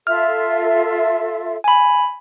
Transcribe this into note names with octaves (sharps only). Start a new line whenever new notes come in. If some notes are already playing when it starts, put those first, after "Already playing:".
F4 A4 E5 F6
G#5 B5